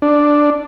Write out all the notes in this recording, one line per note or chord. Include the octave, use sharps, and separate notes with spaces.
D4